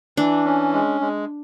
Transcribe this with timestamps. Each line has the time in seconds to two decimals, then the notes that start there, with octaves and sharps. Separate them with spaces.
0.17 E3 D4
0.46 C#4
0.73 G#3
1.01 G#3